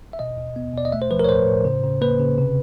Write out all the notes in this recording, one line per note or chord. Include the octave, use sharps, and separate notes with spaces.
E5
B2 D#5
B2
B3
B2 D5
D#5
A3 E5
C5
F3 B4
A#4
C#5
A2 C5
A2
C#3
C#3
A#3 B4
C#3
C3